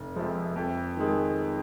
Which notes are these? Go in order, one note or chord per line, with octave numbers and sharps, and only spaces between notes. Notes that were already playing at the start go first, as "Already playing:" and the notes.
Already playing: F1
F2 C3 F3 G#3
F2
D#3 G#3